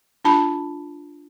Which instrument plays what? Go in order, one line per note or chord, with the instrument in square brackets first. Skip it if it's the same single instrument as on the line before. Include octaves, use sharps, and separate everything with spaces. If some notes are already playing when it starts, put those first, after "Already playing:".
[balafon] D4 F4 A5 B5